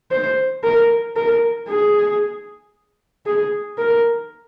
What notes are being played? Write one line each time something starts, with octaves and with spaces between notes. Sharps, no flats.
C5
A#4
A#4
G#4
G#4
A#4